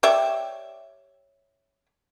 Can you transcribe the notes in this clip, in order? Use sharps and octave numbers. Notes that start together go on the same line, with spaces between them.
G4 C#5 D5 E5